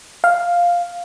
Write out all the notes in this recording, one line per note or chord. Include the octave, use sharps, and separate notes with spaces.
F5